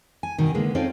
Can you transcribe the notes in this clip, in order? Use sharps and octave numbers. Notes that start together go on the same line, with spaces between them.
G#5
G2 B2 D#3
D3 G#3 A#3 B3
C4 C#4 D#4 F4 A4 D5